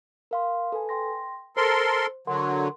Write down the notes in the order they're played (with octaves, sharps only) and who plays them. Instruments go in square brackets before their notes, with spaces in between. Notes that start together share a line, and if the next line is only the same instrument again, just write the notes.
[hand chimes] A#4 F5 C6
A4 B4 G#5
G5 C6 A#6
[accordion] A4 A#4 C6 [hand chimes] C5
[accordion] D3 F#3 [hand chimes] A#4 F#5 C6